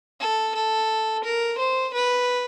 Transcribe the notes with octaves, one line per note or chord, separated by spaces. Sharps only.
A4
A4
A#4
C5
B4